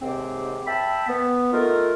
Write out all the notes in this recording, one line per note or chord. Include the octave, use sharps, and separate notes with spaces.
D#2 G#2 C3 C4
E5 G5 A5 B5
B3
A3 D#4 F4 A#4